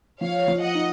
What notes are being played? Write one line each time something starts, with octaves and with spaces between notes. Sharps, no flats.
F3 C#5 F5
F3
D#5 F#5
D#4